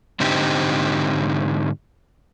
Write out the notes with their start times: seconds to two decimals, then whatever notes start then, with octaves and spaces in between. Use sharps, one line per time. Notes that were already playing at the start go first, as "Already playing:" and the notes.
0.20 G#2 D3 C4 D#4 G4